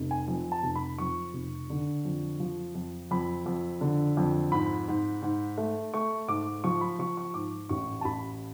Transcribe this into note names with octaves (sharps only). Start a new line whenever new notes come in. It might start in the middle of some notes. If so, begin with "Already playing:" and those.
Already playing: F1
G#5
F2
A5
F1
B5
F2 C#6
F1
D3
F2
F3
F2
F2 B5
F2
D3
F2
G#2 B5
G#2
G#2
A3
A3 C#6
G#2 D6
F3 C#6
B5
F3 C#6
C#6
G#2 D6
A1 C#6
A5
A1 B5